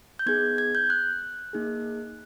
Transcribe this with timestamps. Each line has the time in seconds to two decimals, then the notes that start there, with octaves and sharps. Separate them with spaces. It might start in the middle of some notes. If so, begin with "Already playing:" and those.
0.19 G6
0.26 B3 D#4 G#4 G#6
0.58 G#6
0.75 G6
0.90 F#6
1.53 A#3 D#4 G#4